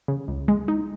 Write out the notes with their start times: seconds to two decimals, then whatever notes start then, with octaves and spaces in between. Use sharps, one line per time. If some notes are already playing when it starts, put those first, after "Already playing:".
0.08 C#3
0.28 C#2
0.48 G#3
0.68 D#4